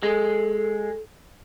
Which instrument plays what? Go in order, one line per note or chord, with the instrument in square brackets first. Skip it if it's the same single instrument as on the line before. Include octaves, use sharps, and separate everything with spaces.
[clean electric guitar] G#3 [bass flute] A4